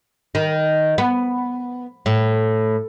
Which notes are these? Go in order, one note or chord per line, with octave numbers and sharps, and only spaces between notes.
D#3
B3
A2